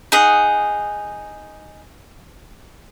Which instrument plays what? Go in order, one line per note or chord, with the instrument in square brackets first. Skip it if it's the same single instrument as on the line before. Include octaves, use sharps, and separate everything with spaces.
[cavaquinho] D#4 G#4 F#5